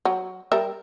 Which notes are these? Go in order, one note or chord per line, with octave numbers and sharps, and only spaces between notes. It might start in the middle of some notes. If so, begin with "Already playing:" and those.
F#3
G3 A#4 E5